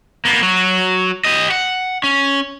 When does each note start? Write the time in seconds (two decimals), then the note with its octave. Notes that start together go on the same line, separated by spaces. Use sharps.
0.25 A#3 B3
0.43 F#3 F#4
1.25 G4 D#5
1.50 F#5
2.04 C#4